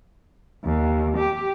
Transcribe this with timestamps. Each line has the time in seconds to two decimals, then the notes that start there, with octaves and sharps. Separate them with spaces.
0.64 D#2
1.18 G4